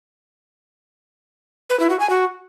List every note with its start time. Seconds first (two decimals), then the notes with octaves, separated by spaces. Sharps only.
1.70 B4
1.80 E4
1.90 F#4
2.00 G#5
2.10 F#4